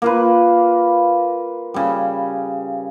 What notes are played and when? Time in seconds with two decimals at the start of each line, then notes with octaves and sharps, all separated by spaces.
0.02 A#3 F4 B4
1.74 C#3 G3